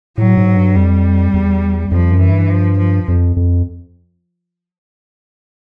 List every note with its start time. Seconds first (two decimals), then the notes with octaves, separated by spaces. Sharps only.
0.18 A2 F#3
0.37 G#2
0.56 G2
0.76 F2 G3
1.34 E2
1.91 F2 F3
2.11 F#2
2.21 E3
2.30 G2
2.50 F3
2.79 F3
3.08 F2
3.36 F2